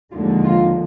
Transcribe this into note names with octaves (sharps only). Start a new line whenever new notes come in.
D#2 D3 F3 G#3 F4
F4